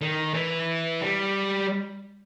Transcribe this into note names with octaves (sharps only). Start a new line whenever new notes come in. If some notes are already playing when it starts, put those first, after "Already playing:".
D#3
E3
G3